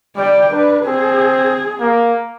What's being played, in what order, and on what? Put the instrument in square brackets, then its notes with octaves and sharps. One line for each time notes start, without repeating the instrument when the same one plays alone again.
[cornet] G3 [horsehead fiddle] D5 G5
[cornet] D4 [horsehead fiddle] B4
[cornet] C4 [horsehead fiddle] G#4
[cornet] A#3